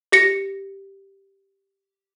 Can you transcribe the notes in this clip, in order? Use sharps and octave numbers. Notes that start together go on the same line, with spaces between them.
G4 A#6 C#7